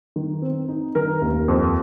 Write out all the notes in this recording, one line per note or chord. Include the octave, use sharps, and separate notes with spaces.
D#3
C4
D#4
D#3 A#4
D#2
F2